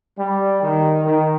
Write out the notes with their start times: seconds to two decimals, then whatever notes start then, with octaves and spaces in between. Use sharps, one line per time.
0.18 G3
0.62 D#3
1.04 D#3